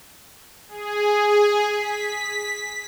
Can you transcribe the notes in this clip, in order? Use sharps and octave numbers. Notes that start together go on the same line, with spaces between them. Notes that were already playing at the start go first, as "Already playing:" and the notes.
G#4
B6